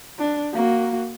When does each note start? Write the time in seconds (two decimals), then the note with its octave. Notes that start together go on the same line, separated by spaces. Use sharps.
0.19 D4
0.53 A#3 F#4